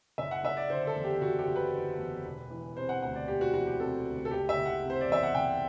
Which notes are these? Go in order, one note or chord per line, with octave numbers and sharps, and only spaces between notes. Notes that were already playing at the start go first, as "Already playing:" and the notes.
F#1 E5
F#5
F#1 E5
D5
D3 C5
A4
E2
G4
F#1 F#4
G4
F#1
B4
D3
E2
E1
E3
C3 C5
F#5
D2 F#5
D5
E1 G4
F#4
E3 F#4
G4
C3 A4
D2
A4
F#1 G4
E5
F#1
F#5
C3
C5
D5
E2 E5
F#5
F#1 G5